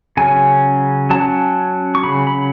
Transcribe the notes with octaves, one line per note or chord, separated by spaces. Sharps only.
C#3 F#3 C#4 G#5
F#3 C#4 A5
C#6
C#3 F#3 C#4 B5
B5